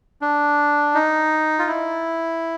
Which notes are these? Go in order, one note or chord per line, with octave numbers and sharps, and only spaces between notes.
D4
D#4
F4
E4